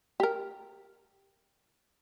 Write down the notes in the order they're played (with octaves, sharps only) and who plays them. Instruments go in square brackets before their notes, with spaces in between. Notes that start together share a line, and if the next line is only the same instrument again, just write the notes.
[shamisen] G4 A#4